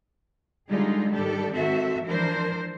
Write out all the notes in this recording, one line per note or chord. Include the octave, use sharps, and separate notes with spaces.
D3 G3 G#3 D#4 F4 G#4
G#2 D#3 G3 D4 G4 A4
G#2 D#3 C4 F#4 A4 E5
E3 F3 D4 A#4 C5